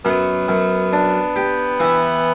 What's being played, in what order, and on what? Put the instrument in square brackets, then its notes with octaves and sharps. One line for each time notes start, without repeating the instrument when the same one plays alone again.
[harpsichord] F#2 [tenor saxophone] B3
[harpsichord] F#2
D4
G4
E3